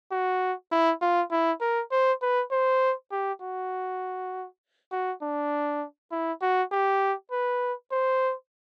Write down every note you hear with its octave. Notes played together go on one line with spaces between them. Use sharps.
F#4
E4
F4
E4
A#4
C5
B4
C5
G4
F#4
F#4
D4
E4
F#4
G4
B4
C5